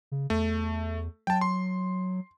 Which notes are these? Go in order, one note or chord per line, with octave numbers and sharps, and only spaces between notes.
C#3
E2 A3
F#3 G5 A5
C6